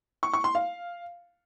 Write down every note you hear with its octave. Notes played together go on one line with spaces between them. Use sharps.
C#6
C#6
C6
F5